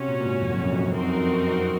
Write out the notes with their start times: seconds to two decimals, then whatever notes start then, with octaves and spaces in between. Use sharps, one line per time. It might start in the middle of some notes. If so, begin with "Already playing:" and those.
Already playing: C3 C#4 F#4 C#5
0.08 A#2
0.21 A#2
0.26 G#2
0.42 F2
0.50 F#2
0.57 F2
0.64 F#2
0.72 F2
0.79 F#2
0.87 F2
0.93 F#2 C4 D#4 F#4 A#4
1.01 F2
1.09 F#2
1.17 F2
1.43 F#2